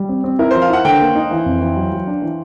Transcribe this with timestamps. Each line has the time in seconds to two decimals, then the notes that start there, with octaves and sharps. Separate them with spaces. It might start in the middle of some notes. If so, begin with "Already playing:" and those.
Already playing: G3
0.09 C4
0.24 C4
0.39 E4 A#4
0.51 F3 C5
0.62 F5
0.70 E4 F#5
0.85 D3 G5
1.00 A#3
1.15 D#4
1.31 E3
1.46 F2
1.61 E3
1.76 F#3
1.92 F#3
2.07 D4
2.22 E3